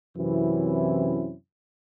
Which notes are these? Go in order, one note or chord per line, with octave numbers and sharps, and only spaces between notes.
F#2 C3 E3 C4 C#4 E4